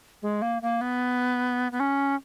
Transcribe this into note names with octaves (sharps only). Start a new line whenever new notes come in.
G#3
A#3
A#3
B3
B3
C#4